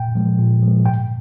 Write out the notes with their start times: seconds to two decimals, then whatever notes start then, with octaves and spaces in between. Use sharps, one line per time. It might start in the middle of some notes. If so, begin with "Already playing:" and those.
Already playing: A#2 G5
0.15 F3 G#3
0.39 A#2
0.62 F3 G#3
0.85 G#2 G5